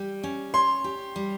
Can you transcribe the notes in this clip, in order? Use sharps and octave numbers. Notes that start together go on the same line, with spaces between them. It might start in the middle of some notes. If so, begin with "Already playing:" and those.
Already playing: G3 G4
C#4
C#5 C6
G4
G3